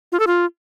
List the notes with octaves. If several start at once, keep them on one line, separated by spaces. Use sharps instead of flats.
F4
A4
F4